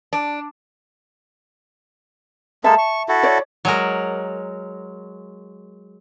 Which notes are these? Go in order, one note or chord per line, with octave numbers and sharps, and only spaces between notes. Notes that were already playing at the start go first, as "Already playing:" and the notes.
D4
G#3 A#3 A4 E5 A5
C#6
E4 F#4 A4
C#5 D5
F#3 G#3 A#4